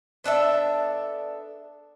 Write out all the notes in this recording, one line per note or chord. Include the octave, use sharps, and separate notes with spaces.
B3 D4 A4 E5